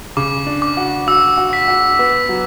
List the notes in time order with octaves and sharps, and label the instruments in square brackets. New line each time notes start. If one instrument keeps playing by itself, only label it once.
[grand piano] C#3 [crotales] D6
[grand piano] D4
[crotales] D6
[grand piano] F#4
[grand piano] F#4 [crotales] E6
[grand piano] F#4
[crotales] B6
[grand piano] F#4
B3
F#3